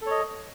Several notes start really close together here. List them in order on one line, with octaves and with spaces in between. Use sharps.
A4 C#5 D#5